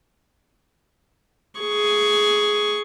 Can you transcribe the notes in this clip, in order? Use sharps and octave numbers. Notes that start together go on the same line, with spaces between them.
G#4 C#6